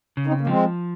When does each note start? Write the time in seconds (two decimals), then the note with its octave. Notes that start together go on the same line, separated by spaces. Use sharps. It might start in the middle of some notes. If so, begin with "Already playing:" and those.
0.17 C#3
0.26 C4 D#4
0.41 A#3
0.47 F3 G#3 C4